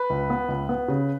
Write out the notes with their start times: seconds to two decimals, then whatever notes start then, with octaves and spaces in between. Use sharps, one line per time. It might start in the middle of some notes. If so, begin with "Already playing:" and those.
Already playing: B4
0.10 C#2
0.30 B3
0.49 C#2
0.69 B3
0.88 C#3